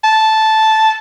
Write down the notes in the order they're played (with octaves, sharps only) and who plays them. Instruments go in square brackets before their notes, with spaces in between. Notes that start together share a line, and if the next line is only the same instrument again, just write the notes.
[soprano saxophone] A5